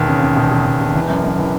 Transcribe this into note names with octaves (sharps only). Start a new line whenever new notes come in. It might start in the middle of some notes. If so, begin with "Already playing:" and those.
Already playing: E1 D#2
C#3
C#3
E1
E1
E1
E1
E3
F#2
F#2
E3